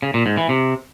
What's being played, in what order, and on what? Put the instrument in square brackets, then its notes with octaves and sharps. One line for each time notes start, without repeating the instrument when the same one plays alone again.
[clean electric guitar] C#3
A#2
G#2
E3
C3